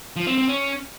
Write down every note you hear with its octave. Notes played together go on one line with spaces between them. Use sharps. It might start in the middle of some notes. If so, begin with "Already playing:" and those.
F3
C4
C4
C#4